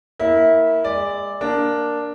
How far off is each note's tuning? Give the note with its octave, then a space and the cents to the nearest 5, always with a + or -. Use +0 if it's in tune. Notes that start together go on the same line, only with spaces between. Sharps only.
A#3 +0 E4 -20
G#3 -30 D5 +0
A#3 +0 D4 +0